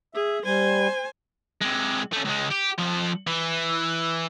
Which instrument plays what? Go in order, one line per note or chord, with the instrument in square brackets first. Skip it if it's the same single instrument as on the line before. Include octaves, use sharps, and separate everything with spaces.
[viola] G#4 [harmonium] E5
[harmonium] G3 [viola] C5 G#5
[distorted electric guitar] C3 G#3
A3 C#4
C#2 G#3
G4
F2 F3
E3